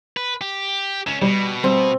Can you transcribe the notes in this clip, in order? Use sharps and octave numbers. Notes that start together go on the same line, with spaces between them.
B4
G4
C#2 C#4 E7
B2 G3
G3 C4